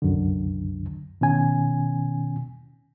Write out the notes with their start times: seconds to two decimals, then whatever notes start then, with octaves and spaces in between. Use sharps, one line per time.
0.02 C2 F#2 D3
1.21 B2 D#3 C#4 G#5